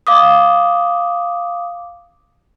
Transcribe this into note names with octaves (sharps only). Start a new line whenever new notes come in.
F5 D6 D#6